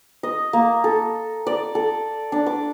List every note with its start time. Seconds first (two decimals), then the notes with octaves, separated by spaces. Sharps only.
0.23 D#5
0.53 A#3
0.84 A4
1.47 D5
1.75 A4
2.32 D4
2.46 D6